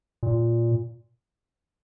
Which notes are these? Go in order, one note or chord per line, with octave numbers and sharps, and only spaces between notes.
A#2